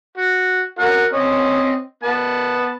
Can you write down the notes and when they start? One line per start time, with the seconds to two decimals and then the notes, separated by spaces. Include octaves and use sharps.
0.17 F#4
0.79 F#4 A#4 F#5
1.13 C4 C#4 D#5
2.03 B3 A5